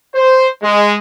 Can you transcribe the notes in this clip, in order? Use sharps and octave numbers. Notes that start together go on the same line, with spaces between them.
C5
G#3